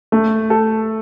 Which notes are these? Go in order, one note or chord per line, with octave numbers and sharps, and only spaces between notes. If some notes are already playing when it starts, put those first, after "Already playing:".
A3
A4